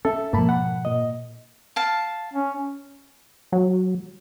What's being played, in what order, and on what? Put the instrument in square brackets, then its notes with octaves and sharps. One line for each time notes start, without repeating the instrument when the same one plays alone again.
[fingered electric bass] C#4 [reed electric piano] A4 E5
[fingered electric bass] G#2 B2 F3 [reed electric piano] A#3 A5 B5
[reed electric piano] F#5
A#2 D#5
[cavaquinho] F5 A5
[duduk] C#4
[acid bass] F#3